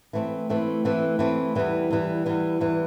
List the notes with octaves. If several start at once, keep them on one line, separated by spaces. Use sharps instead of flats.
E3 A3 C4
E3 A3 C4
E3 A3 C4
E3 A3 C4
E2 E3 G3
E2 E3 G3
E2 E3 G3
E2 E3 G3